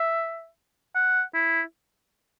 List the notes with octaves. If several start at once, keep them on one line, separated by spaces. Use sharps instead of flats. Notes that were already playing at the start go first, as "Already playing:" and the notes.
Already playing: E5
F#5
E4